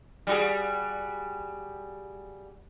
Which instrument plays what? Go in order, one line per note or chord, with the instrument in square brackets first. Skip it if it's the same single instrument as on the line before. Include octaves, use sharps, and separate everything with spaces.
[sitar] G3 F#4 G#4